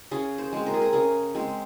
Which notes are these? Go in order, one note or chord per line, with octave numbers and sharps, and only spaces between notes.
C#3 G#4
C5
G#3 C4
A#4
G#4
A#4
C#3 G#4
G#3 C4